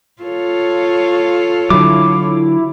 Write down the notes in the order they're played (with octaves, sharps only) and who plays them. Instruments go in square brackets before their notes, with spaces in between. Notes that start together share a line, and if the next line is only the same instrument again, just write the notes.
[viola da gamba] F4 A4 C#5
[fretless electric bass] D3 F#3 [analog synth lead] E4 [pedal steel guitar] D6